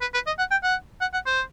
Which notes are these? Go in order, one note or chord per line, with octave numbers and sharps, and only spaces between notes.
B4
B4
D#5
F#5
G5
F#5
F#5
F#5
C5